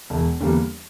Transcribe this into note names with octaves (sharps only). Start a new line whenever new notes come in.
E1
E2 D3 G3 A#3